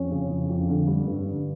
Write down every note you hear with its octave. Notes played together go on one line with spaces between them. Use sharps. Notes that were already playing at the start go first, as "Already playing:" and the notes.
Already playing: F2 C#4 C#5
C#3
F2
F2
D3
G3
G2
D3